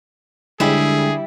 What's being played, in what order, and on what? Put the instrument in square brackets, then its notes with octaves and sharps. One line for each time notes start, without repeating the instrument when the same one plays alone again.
[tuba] D3 [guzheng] G3 E4 [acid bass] G#3 [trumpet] G#4